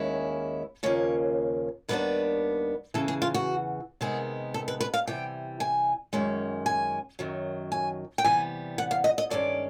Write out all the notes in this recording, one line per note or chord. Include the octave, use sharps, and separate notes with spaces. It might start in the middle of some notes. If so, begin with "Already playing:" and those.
Already playing: D#2 D#3 G#3 C#4 E4
D#2 C#3 F3 A#3 C#5
D#2 D#3 G3 B3 D4 B4
E2 C#3 E3 A4
G#4
F4
F#4
C3 D#3 G#3 B3 G#4
A4
B4
B4
F5
C3 E3 G3 G5
G#5
F#2 D#3 G#3 C#4
G#5
F#2 D#3 F#3
G#5
G5
C3 E3 G3 B3 G#5
F#5
F5
D#5
D#5
G2 D#3 G#3 C#4 D5